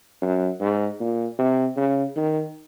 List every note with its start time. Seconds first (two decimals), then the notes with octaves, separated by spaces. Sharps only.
0.22 F#2
0.61 G#2
1.00 A#2
1.38 C3
1.77 C#3
2.16 D#3